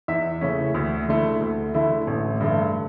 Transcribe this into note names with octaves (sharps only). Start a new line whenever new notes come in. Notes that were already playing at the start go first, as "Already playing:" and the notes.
E2 E5
C#3 E3 A3 C#4
D2
D3 A3 E4
D2
D3 A3 E4
A1
G2 D3 A3